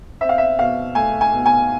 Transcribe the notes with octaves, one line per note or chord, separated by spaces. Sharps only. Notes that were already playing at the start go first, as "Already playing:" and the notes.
C4 E5
F5
E5
B2 F5
A3 G#5
G#5
B2
G#5